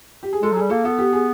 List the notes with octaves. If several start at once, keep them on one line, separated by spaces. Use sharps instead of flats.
G4
G#4
G#3 A4
F#3 G#4
G3
A#3 A4
B3 A4
G4
G#4